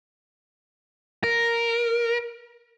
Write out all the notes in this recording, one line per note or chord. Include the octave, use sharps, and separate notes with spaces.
A#4